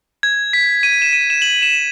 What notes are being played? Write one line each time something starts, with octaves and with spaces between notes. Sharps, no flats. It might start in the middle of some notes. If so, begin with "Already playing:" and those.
G#6
B6
D#7
E7
D#7
E7
F#7
E7